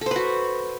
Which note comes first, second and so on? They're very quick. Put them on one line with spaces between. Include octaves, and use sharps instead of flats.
A4 C5 B4 F#4